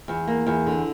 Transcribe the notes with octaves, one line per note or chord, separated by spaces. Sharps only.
E2
A#3
E2
D3